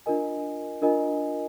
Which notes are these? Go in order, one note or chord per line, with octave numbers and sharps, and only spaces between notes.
D4 F4 A#4 D#5 G#5
D4 F4 A#4 D#5 G#5